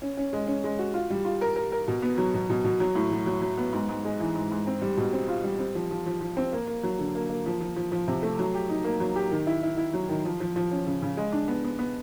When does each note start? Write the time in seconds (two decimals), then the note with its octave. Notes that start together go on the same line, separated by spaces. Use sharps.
0.02 C#4
0.17 C#4
0.33 G#3
0.47 C#4
0.64 G#3
0.79 F#4
0.94 F4
1.10 G3
1.25 F4
1.41 A#4
1.56 A#4
1.72 A#4
1.88 B2
2.02 B3
2.18 F#3
2.34 B2
2.50 B2
2.65 B2
2.80 F#3
2.95 A2
3.12 F#3
3.26 F#3
3.42 F#3
3.58 B3
3.73 G#2
3.89 G#2
4.05 G#3
4.20 E3
4.35 G#2
4.51 G#2
4.67 C4
4.82 G3
4.97 B2
5.13 C4
5.29 F4
5.44 G3
5.59 C4
5.75 F3
5.91 F3
6.06 F3
6.21 F3
6.37 C4
6.53 A#3
6.68 A#3
6.83 F#3
6.99 D3
7.15 A#3
7.30 A#3
7.46 F3
7.60 F3
7.76 F3
7.92 F3
8.08 C3
8.23 A3
8.39 F#3
8.54 G4
8.69 D#4
8.84 A#3
9.00 F#3
9.16 G4
9.31 D#3
9.47 E4
9.63 E4
9.77 E4
9.94 F#3
10.09 D#3
10.25 F3
10.40 F3
10.56 F3
10.71 C#4
10.87 C#3
11.02 C#3
11.17 G#3
11.32 D4
11.48 B3
11.65 B3
11.79 B3